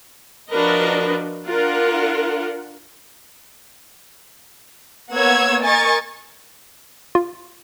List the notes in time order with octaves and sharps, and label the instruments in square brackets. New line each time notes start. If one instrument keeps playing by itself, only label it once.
[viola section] F3 D4 F#4 A#4 B4 D#5
D4 F4 A#4 F#5
[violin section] A#3 B3 C#5 F#5 E6 G#6
A#4 D#5 G#5 C#6 A6
[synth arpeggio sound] F4